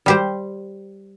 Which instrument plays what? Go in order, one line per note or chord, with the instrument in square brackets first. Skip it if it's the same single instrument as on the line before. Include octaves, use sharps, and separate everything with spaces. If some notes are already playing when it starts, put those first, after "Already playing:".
[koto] G3 G4 C5